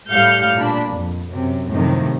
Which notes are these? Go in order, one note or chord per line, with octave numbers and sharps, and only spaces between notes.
A2 G3 F5 F6 G6 C#7
A#2 D4 B5
F2
F#2 C3
F#2 A2 C3 D#3 F3